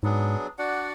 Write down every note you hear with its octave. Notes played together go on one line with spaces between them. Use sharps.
G#2 F#3 B3 D4 G#4
D4 F#4 D5 F#5